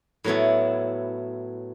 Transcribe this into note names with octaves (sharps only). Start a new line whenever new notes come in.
A2 F#3 B3 E4